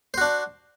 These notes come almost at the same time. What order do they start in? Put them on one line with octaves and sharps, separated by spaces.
C5 F#4 D4